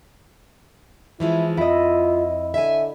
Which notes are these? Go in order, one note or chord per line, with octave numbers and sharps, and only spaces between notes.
E3 F3 G#3 E4
F2 E4 F4 D#5
D3 E5 G#5